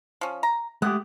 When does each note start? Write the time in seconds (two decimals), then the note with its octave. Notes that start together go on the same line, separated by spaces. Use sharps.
0.21 F3 C#4
0.43 A#5
0.82 G#3 A3 G4 F#5